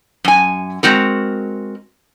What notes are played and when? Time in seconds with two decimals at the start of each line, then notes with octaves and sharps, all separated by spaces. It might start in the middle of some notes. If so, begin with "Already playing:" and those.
0.24 F#2 G#5
0.83 G#3 C4 F#4 A#4